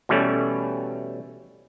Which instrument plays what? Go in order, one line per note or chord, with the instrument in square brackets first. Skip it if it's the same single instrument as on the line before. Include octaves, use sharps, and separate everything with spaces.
[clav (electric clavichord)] B2 E3 G3 A3 C#4